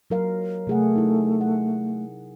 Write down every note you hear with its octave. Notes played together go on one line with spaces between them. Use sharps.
F#3 A#4 F5
C3 A3 G#4 F#5
D#4 E4
F#5